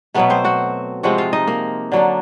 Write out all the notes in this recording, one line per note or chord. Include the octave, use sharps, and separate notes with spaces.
B2 F#3 A3 B3 B4
C4 C5
F#4 F#5
C3 F3 G#3 C4 F#4 F#5
F4 F5
D#4 D#5
A#3 A#4
D3 F#3 A#3 D4